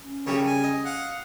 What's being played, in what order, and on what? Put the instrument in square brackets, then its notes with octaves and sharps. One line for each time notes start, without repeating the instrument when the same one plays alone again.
[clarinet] C#4
[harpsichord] C#3 G3 [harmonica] A3 A#3 C#5
[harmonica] G#5
[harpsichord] D#5
[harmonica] F5 F#5